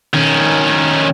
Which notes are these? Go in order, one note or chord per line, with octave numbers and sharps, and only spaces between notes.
D#3 C#4